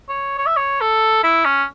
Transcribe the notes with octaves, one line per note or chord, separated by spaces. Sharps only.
C#5
C#5
E5
C#5
A4
E4
C#4